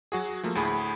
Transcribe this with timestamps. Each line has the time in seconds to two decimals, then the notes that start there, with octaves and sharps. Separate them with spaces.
0.12 F#3 F#4 G#4
0.44 F3 A3 A#3
0.55 D2 A2 G#4 B5